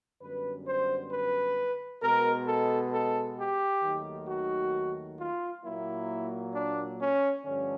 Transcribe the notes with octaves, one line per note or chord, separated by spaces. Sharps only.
F#2 D3 G3 B3 B4
C5
B4
B2 G#3 B3 A#4
A4
A4
G4
D#2 D#3 F#3 A3
F#4
F4
A#2 F#3 A#3 E4
D4
C#4
G2 D3 F3 A3 C#4